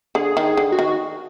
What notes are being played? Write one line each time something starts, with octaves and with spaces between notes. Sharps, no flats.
D3 G#4
D#3
G#4
D3
F#4
D#3